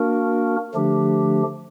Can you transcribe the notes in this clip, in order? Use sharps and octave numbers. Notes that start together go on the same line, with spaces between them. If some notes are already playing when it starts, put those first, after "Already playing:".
Already playing: A#3 D4 F#4 A#4
D3 F3 A3 D4 G4